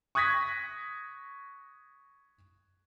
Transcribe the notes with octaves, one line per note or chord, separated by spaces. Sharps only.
C#6 D#6 F#6 G#6 A#6 B6